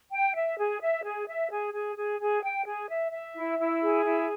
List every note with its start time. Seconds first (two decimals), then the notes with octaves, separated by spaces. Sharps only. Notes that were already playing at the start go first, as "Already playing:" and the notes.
0.12 G5
0.35 E5
0.58 G#4
0.81 E5
1.04 G#4
1.27 E5
1.50 G#4
1.73 G#4
1.97 G#4
2.20 G#4
2.43 G5
2.66 G#4
2.89 E5
3.12 E5
3.35 E4
3.58 E4
3.82 G#4
4.05 E4